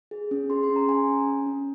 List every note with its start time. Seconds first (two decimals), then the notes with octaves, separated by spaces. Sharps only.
0.11 G#4
0.31 C#4
0.50 G#4 C6
0.63 C6
0.69 C#4
0.76 A#5
0.88 C#4 G#5
1.08 C#4
1.27 C#4
1.46 C#4